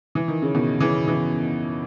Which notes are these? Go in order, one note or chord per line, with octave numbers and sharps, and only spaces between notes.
E3
D#3
C#3
B2 D#3
C#3 E3
E3